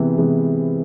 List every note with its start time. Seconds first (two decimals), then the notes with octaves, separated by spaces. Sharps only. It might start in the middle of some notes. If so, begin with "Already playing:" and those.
Already playing: C3 E3 G#3 B3
0.18 C3 E3 G#3 B3